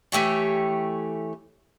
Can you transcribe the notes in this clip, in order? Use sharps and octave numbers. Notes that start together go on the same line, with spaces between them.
E3 A3 G4 C#5